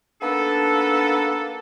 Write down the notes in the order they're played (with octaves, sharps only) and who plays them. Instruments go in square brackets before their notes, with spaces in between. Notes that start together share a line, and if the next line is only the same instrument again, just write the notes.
[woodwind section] A#3 B3 D4 D#4 A4